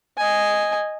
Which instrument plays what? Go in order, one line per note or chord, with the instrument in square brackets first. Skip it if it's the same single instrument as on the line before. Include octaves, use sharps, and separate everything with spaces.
[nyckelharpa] D#5 G#5